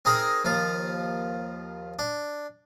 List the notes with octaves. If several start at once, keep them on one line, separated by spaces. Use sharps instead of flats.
C4 D#4 G#4 A#4
D#2 F3 F4
D4